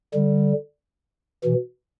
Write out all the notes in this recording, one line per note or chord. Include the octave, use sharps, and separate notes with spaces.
D3 G3
B2 E3